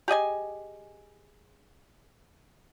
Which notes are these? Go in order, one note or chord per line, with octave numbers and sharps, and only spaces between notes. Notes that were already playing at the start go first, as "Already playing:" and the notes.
G4 G#4 D#5 G#5